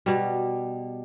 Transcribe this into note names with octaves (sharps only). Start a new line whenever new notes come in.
B2 G3